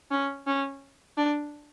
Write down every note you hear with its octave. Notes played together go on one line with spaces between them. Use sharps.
C#4
C#4
D4